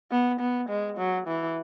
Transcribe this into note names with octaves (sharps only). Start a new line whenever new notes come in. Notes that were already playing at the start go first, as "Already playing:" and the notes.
B3
B3
G#3
F#3
E3